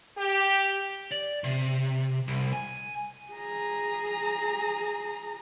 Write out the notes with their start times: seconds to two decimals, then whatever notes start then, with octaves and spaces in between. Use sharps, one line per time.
0.17 G4
1.12 D5
1.44 C3
2.28 C2
2.53 G#5
3.33 G#4 A#5